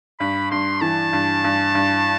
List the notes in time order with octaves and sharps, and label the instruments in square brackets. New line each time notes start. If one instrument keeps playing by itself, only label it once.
[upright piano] G2 [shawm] B5
[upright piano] G2 [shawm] C6
[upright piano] E3 [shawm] A5
[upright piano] G2
G2
G2